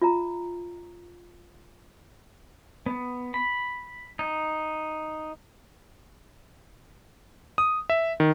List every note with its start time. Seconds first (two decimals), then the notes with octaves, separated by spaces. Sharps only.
0.02 F4 E5 A#5
2.86 B3
3.34 B5
4.19 D#4
7.58 D#6
7.90 E5
8.20 D#3